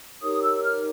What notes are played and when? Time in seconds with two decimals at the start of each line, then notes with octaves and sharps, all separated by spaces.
0.22 D#4 G4 A#4 C#5 D#6
0.42 E6
0.63 F6